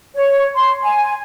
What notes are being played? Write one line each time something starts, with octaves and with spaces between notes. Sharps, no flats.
C#5
C6
G#5